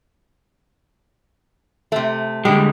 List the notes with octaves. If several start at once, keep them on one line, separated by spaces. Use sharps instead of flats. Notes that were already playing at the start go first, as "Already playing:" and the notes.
C3 A3
D3 G3 G#3 G4